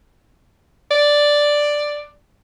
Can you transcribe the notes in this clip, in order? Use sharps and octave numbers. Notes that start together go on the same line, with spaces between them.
D5